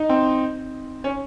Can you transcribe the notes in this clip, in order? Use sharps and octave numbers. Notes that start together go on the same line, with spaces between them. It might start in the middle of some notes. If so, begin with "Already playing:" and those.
Already playing: D#4
C4
C#4